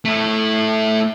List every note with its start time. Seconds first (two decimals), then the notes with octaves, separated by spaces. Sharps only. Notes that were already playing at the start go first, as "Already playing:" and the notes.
0.05 A3 E4